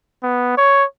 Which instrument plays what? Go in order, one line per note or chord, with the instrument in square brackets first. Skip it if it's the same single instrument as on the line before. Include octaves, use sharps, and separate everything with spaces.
[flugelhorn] B3
C#5